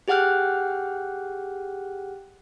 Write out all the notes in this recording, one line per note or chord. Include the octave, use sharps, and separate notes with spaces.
G4 G#4 F#5 G5 F6 F#6